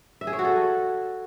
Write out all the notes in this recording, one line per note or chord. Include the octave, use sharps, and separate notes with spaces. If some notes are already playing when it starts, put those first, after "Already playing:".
E5
G#4
C#5
F#4
A4